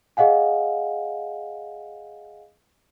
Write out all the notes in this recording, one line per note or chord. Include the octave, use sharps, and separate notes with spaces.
G#4 D#5 F5 F#5 G#5